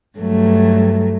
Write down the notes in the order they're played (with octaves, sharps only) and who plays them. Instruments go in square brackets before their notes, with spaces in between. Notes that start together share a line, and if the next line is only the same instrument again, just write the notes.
[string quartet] G2 F#3 A3